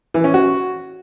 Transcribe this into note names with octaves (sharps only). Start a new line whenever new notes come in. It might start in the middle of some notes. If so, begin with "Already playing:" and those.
E3
C#4
F#4